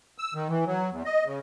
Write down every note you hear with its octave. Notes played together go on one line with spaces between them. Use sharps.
E6
D#3
E3
F#3
E2
D#5
C#3